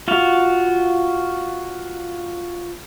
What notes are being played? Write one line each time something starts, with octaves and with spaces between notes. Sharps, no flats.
F4 F#4 F5